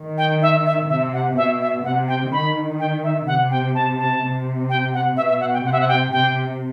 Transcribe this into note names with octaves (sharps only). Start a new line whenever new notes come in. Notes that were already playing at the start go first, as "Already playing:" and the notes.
Already playing: D#3
G5
E5
E5
C3 E5
F#5
B2 E5
E5
C3 F#5
G5
D#3 B5
G5
E5
C3 F#5
G5
A5
A5
C3
G5
F#5
B2 E5
E5
F#5
G5
C3 F#5
E5
F#5
G5
C3 G5